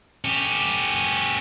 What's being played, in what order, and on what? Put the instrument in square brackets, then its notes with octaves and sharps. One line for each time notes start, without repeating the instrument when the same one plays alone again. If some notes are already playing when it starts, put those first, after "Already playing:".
[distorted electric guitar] C#4 G4